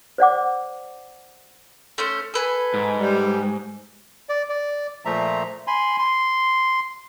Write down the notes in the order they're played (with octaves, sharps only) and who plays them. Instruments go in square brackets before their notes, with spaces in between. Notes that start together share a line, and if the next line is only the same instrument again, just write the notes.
[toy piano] C5 D5 F#5 D6
[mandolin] A3 C#4 C5
A4 B4 G#5
[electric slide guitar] G#2
[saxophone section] G3
[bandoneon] D5
D5
A#2 F3 A3 E5 A#5
G#5 B5 C6
C6